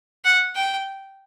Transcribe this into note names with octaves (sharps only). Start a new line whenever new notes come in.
F#5
G5